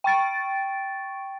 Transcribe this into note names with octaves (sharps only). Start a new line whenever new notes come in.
G5 C#6 A6 D7